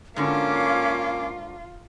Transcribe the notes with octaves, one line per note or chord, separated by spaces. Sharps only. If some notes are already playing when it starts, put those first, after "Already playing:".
G#2 D3 A#3 C#4 F4 F#4 D6